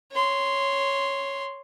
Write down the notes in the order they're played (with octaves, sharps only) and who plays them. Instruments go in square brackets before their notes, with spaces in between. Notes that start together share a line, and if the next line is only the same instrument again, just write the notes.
[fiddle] C#5 C6